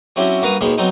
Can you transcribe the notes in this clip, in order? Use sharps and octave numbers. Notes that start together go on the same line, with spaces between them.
F#3 C4 C#4 E4 F#4 G4
G2 A#3 F#4 B4 A#5 D#6
D#2 B2 D#3 G#3 B5
F#3 B3 C4 D#4